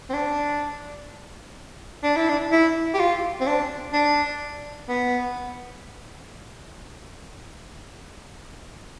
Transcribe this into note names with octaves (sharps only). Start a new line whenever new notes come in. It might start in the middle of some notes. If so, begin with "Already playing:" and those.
C4
D4
D4
E4
D4
E4
G4
F4
C4
D4
D4
B3